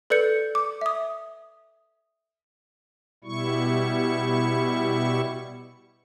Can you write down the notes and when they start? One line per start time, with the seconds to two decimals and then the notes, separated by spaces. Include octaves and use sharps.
0.10 A4 B4 D5 G6 C#7
0.55 D6
0.81 E5 D#6
3.24 B2 G3 E4 C#6